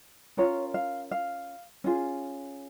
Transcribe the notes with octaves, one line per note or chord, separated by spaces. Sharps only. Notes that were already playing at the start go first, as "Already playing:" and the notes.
C#4 F4 A#4 C#5
F5
F5
C#4 F4 G#4